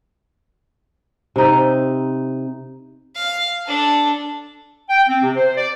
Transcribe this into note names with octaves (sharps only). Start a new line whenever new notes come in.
C3 D#4
F5
D4 A4
G5
C4
C3
C5
D5